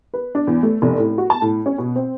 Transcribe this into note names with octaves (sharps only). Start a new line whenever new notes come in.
B4
D4
E2
A3
F1
A2
F#4
A5
A2
C#4
B2
C4